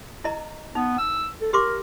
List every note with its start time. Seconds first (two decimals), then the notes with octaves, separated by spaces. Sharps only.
0.24 E4 D#5 A#5
0.75 B3 D#4
0.99 E6
1.41 A4
1.53 G4 A#4 C6 D6